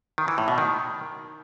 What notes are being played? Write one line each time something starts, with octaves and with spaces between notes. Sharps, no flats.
D#3
E3
A2
B2
D#3